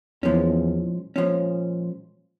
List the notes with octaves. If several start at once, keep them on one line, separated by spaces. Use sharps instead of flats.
E2 A#2 F3 G#3 C#4
A#2 F3 G#3 C#4